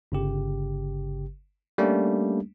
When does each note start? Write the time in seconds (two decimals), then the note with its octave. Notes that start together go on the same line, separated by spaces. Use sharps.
0.12 G1 C#3 G4
1.78 G3 A3 A#3 C#4 D4